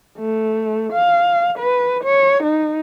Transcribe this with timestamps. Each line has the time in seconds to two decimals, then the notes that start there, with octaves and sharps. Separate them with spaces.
0.18 A3
0.93 F5
1.58 B4
2.04 C#5
2.43 D#4